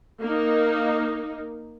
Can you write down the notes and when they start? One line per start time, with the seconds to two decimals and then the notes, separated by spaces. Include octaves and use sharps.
0.21 A#3 D#4